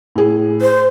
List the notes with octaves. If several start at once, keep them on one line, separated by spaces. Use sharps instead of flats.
A2 G#4
C5